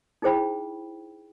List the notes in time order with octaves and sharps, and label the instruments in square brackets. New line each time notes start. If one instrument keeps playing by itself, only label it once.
[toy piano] D#4 E4 G#4 C5 G5 B5